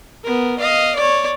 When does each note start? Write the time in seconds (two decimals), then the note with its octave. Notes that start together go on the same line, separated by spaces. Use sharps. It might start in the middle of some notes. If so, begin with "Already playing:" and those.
0.24 B3 A#4
0.59 D#5 F5
0.96 C#5 D5